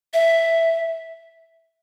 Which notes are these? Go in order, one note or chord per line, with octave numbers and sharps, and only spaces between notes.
E5